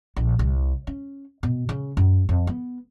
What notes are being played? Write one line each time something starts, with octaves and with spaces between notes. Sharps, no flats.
A#1
C2
C#4
B2
C#3
F#2
F2
B3